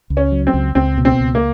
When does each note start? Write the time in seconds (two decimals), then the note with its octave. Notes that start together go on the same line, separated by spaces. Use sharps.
0.10 C#2
0.17 C#4
0.32 F#3
0.47 C4
0.54 C#2
0.75 C#2 C4
0.98 B2
1.05 C4
1.20 C#2
1.35 A#3